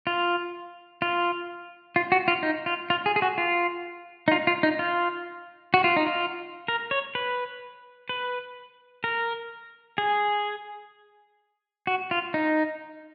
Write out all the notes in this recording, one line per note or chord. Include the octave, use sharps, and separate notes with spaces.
F4
F4
F4
F#4
F4
D#4
F4
F4
G#4
G#4
F#4
F4
D#4
F4
F4
D#4
F4
F#4
F4
D#4
F4
A#4
C#5
B4
B4
A#4
G#4
F#4
F4
D#4